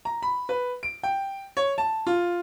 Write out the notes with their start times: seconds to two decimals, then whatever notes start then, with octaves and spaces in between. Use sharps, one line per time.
0.05 A#5
0.22 B5
0.49 B4
0.83 D7
1.03 G5
1.57 C#5
1.78 A5
2.07 F4